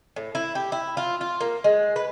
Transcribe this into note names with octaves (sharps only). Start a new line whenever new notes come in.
A2
E4
G4
E4
F4
F4
A#3
G#3
B4